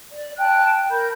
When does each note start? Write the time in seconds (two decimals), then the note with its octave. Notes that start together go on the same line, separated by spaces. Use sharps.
0.11 D5
0.38 G5 A5 F#6
0.90 A#4 B5 G6